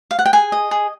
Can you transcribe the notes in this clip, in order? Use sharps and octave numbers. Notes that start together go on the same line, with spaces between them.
F5
F#5
G5
G#4 G#5
D#5
G#4